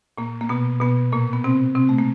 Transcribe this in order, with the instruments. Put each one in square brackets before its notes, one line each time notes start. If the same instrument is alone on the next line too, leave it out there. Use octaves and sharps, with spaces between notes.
[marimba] A#2 A#3
A#3
B2 B3
B2 B3
A#2 A#3
B3
C3 C4
C3 C4
A3
A#3